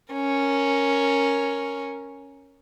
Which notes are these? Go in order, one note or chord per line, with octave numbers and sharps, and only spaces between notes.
C#4 A#4